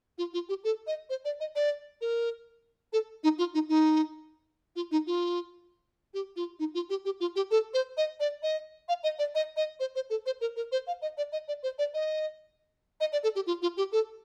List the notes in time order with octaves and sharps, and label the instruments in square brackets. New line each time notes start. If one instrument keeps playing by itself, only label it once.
[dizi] F4
F4
G4
A4
D#5
C5
D5
D#5
D5
A#4
A4
D#4
F4
D#4
D#4
F4
D#4
F4
G4
F4
D#4
F4
G4
G4
F4
G4
A4
C5
D#5
D5
D#5
F5
D#5
D5
D#5
D#5
C5
C5
A4
C5
A#4
A#4
C5
F5
D#5
D5
D#5
D5
C5
D5
D#5
D#5
D5
A4
G4
F4
F4
G4
A4